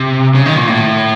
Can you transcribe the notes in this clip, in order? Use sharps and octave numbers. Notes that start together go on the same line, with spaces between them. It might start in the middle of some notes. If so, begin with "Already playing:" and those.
Already playing: C3
C#3
D#3
A#2
A2